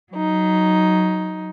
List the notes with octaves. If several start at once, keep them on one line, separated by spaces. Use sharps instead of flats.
F#3 D#4